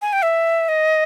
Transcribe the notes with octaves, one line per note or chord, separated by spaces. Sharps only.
G#5
G5
E5
D#5